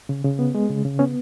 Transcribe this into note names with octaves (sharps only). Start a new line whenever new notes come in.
C#3
C#3
B3
G#3
C#3
C#3
B3 C#4